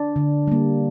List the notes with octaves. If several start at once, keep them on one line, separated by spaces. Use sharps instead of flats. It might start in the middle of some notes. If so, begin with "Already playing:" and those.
Already playing: D4
D3
G3 A#3